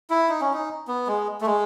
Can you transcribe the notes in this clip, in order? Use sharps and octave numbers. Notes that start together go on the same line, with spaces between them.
E4
D#4
C#4
D#4
B3
G#3
A3
G#3